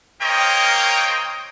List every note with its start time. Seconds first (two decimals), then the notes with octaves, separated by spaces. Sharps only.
0.21 A#3 C4 A#4 C#5 D#5 G5